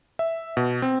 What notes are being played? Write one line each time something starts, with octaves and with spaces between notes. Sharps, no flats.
E5
B2
C4